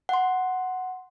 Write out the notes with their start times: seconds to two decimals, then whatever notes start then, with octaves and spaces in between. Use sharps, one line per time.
0.09 F#5 C6